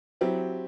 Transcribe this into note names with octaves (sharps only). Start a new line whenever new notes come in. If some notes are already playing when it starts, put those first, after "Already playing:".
F#3 C4 E4 G4